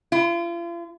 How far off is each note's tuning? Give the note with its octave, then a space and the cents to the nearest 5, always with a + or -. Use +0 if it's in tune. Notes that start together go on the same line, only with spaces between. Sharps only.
F4 -40